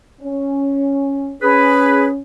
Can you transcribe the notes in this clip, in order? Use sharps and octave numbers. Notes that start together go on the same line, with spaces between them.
C#4
C#4 G#4 B4